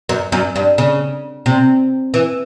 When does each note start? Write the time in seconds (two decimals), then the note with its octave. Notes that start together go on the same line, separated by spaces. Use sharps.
0.09 F#2
0.32 F#2
0.56 G2
0.78 C#3
1.46 C3
2.14 E3